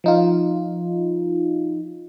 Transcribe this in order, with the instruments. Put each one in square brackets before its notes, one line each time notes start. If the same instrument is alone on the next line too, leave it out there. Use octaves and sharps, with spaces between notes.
[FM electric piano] F3 D#4 F4